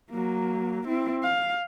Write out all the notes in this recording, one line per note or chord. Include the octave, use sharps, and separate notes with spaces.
F#3 A#3
C4 E4
F5